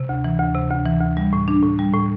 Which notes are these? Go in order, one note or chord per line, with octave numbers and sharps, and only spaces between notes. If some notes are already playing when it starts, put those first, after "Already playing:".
Already playing: C3
D2
E3
D2
C3
D2
E3
D2
G3
A2
D4
A2
G3
A2